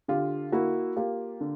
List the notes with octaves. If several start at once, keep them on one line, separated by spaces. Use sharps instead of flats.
D3 F4 G4
A#3 E4 F#4
A#3 F4 G4
D3